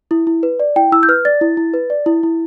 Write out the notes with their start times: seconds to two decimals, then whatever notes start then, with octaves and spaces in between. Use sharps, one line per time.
0.11 E4
0.27 E4
0.43 B4
0.60 D5
0.76 E4 G5
0.92 E4 E6
1.03 G6
1.09 B4 F6
1.25 D5 A6
1.41 E4
1.57 E4
1.74 B4
1.90 D5
2.06 E4
2.23 E4